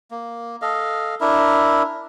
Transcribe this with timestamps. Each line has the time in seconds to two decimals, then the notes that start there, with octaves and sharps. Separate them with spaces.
0.11 A#3
0.62 A4 D#5 F5
1.21 D4 E4 A#4 E5